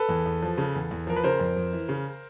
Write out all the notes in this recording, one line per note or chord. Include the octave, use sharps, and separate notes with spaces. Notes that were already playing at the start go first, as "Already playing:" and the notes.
Already playing: A4 B4
E2
E2
F3
C#3
E2
E2
F3 A#4
B4
C#3 A#4 C5
F2
F2
E3
C#3